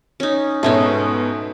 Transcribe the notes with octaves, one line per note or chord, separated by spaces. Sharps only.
C#4 D#4
G#2 B2 A3 C#4 D#4